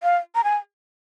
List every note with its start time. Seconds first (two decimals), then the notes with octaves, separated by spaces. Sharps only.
0.03 F5
0.35 A#5
0.44 G#5